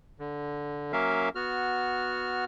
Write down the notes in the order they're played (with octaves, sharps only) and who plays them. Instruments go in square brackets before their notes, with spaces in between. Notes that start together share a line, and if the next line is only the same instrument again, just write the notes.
[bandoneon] D3
F#3 A#3 C#4 A#4 E5 F5
B3 F#4 F6